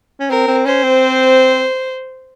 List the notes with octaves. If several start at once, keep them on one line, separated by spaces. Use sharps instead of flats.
C#4
C4 A#4
C4
C#4 C5
C4